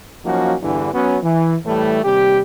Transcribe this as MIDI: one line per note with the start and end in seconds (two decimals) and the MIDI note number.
0.25 0.55 53
0.25 0.55 54
0.25 0.55 58
0.25 0.55 61
0.25 0.55 63
0.25 0.55 66
0.62 0.90 40
0.62 0.90 43
0.62 0.90 50
0.62 0.90 52
0.93 1.18 54
0.93 1.18 59
0.93 1.18 61
1.23 1.55 52
1.66 2.04 45
1.66 2.04 52
1.66 2.04 55
1.66 2.04 57
2.04 2.41 39
2.04 2.41 48
2.04 2.41 55
2.04 2.41 67